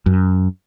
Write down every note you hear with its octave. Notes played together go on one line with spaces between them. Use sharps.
F#2